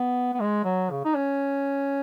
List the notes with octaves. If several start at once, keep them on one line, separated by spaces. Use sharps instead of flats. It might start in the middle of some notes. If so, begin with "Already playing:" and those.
Already playing: B3
B3
G#3
F#3
C#3
D#4
C#4